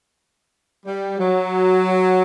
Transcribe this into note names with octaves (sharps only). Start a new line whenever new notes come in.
G3
F#3